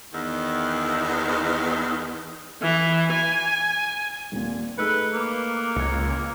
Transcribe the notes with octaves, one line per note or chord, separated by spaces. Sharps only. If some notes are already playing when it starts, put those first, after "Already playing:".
E2 D#3
E3
G#5
D#1 A#2
A3 D#4 G#4 B4 E6 F#6 C#7
A#3 D6 E6
C#2 G#6 C#7
A#3